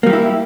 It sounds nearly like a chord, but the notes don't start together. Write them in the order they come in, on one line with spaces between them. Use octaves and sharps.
A#3 G3 G4 E4